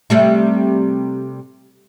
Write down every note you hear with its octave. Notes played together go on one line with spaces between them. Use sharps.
C3 G3 A3